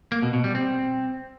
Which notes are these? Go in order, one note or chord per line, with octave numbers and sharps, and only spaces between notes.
A#3
B2
B2
G3
C4